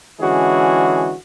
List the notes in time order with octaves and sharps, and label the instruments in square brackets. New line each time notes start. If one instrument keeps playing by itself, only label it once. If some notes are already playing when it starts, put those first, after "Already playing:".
[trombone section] D3 E3 G#3 C#4 F#4 G#4